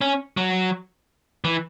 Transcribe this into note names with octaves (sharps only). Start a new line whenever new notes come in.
C#4
F#3
E3